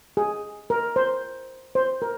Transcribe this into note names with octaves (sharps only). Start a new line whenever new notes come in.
G#4
A#4
C5
C5
A#4